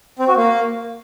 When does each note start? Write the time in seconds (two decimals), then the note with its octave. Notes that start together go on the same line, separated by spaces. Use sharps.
0.19 C4
0.28 F#4
0.37 A#3